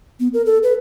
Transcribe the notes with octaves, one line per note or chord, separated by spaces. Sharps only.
B3
A#4
A4
B4